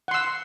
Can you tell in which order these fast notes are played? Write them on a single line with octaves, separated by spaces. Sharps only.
F#5 C6 E6